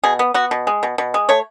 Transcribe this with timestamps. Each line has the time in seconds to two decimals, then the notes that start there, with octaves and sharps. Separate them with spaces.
0.04 B2 G#4
0.19 B3
0.34 B3 F#4
0.51 B2
0.67 G#3
0.83 B2
0.98 B2
1.14 G#3
1.29 A3 C#5